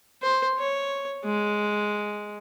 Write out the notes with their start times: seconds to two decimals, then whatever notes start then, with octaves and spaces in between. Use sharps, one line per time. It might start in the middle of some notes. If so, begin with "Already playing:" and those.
0.22 C5
0.58 C#5
1.25 G#3